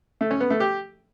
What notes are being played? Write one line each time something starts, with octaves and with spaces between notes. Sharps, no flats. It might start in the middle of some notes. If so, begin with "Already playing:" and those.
A3
C#4
B3
A3
G4